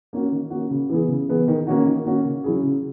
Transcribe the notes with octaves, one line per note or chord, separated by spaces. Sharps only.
A#3 C#4 F#4
D#3
A#3 C#4 F#4
C#3
E3 B3 E4 G#4
C#3
E3 B3 E4 G#4
D#3
A#3 C#4 F#4
D#3
A#3 C#4 F#4
C#3
F#3 C#4 E4 G#4
C#3